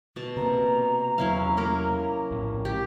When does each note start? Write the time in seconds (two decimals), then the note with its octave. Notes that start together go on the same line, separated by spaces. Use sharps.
0.16 B2 A5
0.37 C3 A#3 A#5
1.18 E2 C3 F#3 C#4 E4 F5
1.57 A#3 C#4 A#4
2.31 A#1 A2
2.65 G4